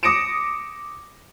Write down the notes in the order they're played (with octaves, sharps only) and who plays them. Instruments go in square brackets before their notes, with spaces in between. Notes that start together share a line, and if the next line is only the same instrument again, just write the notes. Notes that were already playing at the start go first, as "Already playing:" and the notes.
[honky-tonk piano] D6 D#6 A#6 C#7 D7 E7